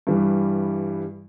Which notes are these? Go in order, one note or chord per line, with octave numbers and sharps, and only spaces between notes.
G2 E3 G3